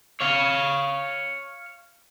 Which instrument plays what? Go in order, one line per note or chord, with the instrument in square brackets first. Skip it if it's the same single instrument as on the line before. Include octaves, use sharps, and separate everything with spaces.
[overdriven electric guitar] C#5 F5